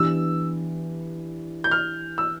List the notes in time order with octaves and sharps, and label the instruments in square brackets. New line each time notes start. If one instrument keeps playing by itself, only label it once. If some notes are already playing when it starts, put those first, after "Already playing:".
Already playing: [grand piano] E3 B3 D4 G4 [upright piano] E6
[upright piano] G6
F6
E6